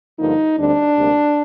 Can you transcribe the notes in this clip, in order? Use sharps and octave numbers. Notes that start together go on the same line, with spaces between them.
G2 D3 F3 A#3 D#4
D2 D3 G3 C4 D4
D2 C3 G3 A#3